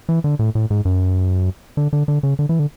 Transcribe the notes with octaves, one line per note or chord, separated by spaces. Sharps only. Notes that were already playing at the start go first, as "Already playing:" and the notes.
E3
D3
A2
A2
G#2
F#2
D3
D3
D3
C#3
D3
E3
D3